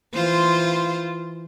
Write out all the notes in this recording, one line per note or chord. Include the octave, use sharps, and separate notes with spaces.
E3 F4 C5